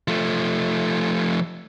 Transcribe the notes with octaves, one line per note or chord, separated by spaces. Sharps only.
F3 A3